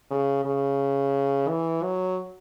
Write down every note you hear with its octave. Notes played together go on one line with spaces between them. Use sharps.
C#3
C#3
E3
F#3